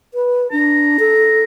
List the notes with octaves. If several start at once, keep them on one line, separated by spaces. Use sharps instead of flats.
B4
D4 A#5
A4